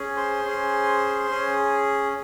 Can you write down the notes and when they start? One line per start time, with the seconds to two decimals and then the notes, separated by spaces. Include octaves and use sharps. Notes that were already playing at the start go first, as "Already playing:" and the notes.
Already playing: C#4 G#4
0.16 C5 C6
0.44 C#4 G#4
1.29 C#4 G#4